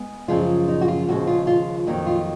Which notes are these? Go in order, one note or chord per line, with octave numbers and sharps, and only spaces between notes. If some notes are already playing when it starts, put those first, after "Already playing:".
Already playing: G#3 B3
F#2 C#3 F3 G#3 F4
D#4
F#4
F4
D#2 C#3 F3 G#3 F#4
F4
F4
F2 D#3 F#3 A#3 D#4
F4